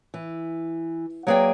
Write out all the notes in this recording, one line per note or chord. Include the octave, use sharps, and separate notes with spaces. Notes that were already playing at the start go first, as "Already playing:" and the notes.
E3
F#3 A#3 G#4 B4 D5 G5